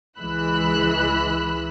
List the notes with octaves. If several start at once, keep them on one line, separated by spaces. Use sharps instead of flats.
C#2 E3 G#3 B5 E6 F#6